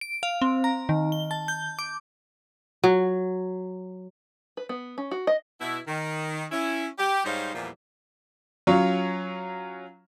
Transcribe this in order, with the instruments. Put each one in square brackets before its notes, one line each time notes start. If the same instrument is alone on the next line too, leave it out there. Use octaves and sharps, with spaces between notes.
[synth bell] D7
F5
C4
A#5
D#3
G7
A5
G6
D6
[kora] F#3
[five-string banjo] B4
B3
C#4
F#4
D#5
[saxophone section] B2 E4
D#3
C#4 E4
G4
G#2 G3 D#4 C5 C#5 F5
E2 A#2 E3 F3 G3
[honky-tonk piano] F#3 C#4 F4 C#5